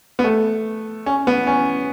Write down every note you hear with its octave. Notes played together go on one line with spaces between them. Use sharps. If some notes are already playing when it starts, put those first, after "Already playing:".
B3
A3
C#4
B3
C#4